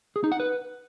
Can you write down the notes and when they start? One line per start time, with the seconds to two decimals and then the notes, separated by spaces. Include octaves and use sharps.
0.16 G#4
0.24 D#4
0.32 F#5
0.40 B4